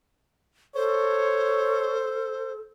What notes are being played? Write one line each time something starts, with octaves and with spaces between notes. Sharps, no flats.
A4 C5 C#5